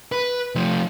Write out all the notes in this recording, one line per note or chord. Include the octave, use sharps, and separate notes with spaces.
B4
F3 A3